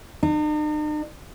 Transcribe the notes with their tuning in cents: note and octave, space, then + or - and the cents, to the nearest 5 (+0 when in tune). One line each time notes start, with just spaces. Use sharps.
D#4 -45